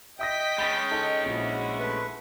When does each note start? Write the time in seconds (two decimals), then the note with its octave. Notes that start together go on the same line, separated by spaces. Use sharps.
0.19 D#5 E5 G5 D#6 G6 A#6 B6
0.58 G#3 C#4 B5 A6
0.91 D#4 A4
1.25 A#1 E4 F#4
1.79 A3 B4